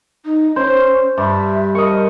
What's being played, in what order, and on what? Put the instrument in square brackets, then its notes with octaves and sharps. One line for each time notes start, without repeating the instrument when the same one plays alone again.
[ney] D#4
[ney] C#4 [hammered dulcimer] C5
[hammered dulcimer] G2 [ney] E5
[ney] A#4 [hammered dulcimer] D#5 C#6